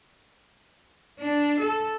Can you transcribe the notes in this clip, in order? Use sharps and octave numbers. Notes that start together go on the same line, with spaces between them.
D4
A4